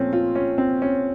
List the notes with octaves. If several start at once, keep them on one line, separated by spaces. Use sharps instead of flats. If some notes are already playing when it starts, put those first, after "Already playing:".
Already playing: A#2 F3 A3 C4 C#4
F4
C#4
C4
C#4